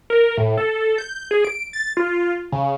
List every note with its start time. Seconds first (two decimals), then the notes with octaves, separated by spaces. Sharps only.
0.10 A#4
0.37 A2
0.57 A4
0.98 G6
1.31 G#4
1.45 D7
1.73 A6
1.97 F4
2.52 C#3